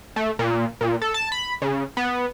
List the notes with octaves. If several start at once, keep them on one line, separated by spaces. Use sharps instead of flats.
A3
A#2
A#2
A4
A5
B5
C#3
B3